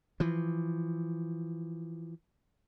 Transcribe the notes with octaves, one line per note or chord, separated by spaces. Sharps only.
E3 F3